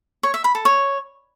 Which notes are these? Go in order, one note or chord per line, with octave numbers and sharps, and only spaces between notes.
C#5
E5
B5
A4
C#5